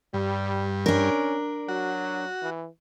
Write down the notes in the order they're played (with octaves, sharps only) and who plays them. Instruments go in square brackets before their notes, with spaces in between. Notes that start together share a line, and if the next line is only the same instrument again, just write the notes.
[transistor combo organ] G2 [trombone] G3
[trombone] C#4 [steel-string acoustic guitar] D4 A#4
[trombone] F#3 [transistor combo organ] F#4
[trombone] E3